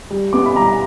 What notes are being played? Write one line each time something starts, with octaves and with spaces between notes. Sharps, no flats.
G3
B3 D6
B5
G3 A#5